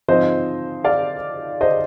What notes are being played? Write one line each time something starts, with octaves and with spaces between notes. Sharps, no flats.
G#2 F3 C4 C5 D#5
D5 F5
C5 D#5